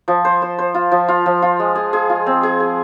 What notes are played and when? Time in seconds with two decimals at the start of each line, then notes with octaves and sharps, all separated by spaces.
0.08 F3
0.25 C5
0.42 C5
0.59 C5
0.74 F4
0.92 F3
1.08 F4
1.26 F3
1.42 F4
1.60 G#3
1.75 G#4
1.93 G#4
2.10 F4
2.26 C4
2.43 G#4
2.60 G#4